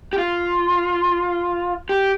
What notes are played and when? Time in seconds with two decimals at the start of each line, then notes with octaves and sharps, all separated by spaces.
0.13 G4
0.18 F4
1.89 G4